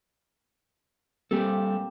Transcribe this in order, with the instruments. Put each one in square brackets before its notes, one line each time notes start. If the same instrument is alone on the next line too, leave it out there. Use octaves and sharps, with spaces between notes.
[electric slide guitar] G3 A4 [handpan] A#3 C4 G4